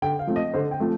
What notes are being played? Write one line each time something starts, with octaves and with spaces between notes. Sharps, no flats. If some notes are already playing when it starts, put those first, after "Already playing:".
D3 G5
F5
F3 A3 C4
D#5
D3 C5
G5
F3 A3 C4